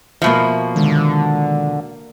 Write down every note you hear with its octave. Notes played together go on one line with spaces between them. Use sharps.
B2 F3 A#3 E5
D3 D#3 G#3